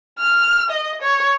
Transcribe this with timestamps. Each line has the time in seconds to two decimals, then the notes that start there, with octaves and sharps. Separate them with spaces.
0.19 F6
0.70 D#5
1.01 C#5